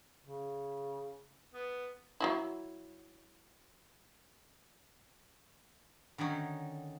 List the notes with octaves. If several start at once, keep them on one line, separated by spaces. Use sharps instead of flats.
C#3
B3
F#3 D#4 E4
D3 D#3 F#3 C#4 D#4